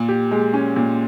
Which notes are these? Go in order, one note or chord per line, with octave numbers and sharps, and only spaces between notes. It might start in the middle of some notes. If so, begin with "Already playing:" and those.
Already playing: A#2
G4
G#3
C#4
A#2